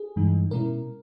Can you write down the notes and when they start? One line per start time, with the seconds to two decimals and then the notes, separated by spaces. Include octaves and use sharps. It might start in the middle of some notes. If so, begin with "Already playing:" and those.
Already playing: G#4
0.16 G2 E3 G#3 D#4
0.51 B2 G#3 C#4 E4 A#4